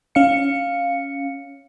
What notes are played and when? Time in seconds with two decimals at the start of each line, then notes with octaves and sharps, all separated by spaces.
0.15 C#4 F5 C#7